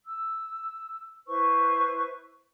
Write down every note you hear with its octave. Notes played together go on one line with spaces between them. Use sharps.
E6
E4 B4 C5 C#6